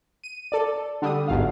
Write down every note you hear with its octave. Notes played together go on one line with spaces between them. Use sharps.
D#7
A4 D5
D3 G3 D#6
G1 G#2 F#3 F5